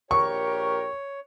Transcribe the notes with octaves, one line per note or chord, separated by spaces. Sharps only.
A#1 G4 A#4 C#5 C#6